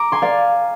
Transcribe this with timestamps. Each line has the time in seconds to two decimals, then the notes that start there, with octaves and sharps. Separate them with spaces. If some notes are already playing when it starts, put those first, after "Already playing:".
Already playing: A#5 D6
0.12 G#5 C6
0.22 D5 F5